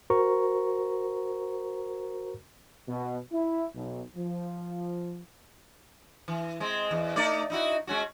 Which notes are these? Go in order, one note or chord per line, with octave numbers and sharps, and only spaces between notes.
F#4 A#4 C5 A#5 C#6
B2
E4
B1
F3
E3
G#3 C4
E2
A3 D#4 D5
D#4 E4 F#4
G#3 C#4 F#4